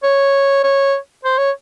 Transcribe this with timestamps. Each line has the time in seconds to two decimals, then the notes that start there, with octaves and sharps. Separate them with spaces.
0.03 C#5
0.64 C#5
1.24 C5
1.38 C#5